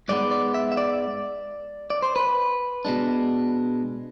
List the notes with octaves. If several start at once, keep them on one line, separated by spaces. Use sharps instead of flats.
G#2 G#3 B3 D5
D5
E5
E5
D5
D5
C5
B4
B2 G#3 D4